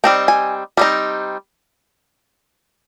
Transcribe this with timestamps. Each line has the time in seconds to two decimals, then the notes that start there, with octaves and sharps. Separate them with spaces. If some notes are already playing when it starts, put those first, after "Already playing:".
0.04 G3 C4 D#4 G5
0.28 G#5
0.77 G3 C4 D#4